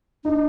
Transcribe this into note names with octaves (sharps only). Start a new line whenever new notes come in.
D4 D#4